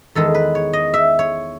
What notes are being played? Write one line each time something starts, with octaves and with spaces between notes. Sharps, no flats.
E2 D#3 G#3 A4
B4
C#5
D#5
E5
C#5